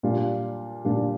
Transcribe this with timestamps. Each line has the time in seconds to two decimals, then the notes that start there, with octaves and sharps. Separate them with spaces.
0.03 A#2 G3 D4 F4
0.85 A#2 G3 D4 F4